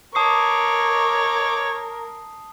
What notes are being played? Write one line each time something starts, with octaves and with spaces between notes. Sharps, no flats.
A#4 C#5 A5 D6 D#6 C7